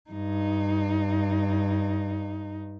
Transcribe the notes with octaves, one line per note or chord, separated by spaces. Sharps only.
G2 D#4